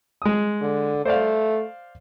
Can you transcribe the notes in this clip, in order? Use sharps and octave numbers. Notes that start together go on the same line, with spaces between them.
G#3 D#6
D3
A3 C5 D5 F5